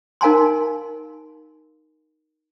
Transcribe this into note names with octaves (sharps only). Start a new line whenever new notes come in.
D#4 A#4 F5 G#5 A#5 C6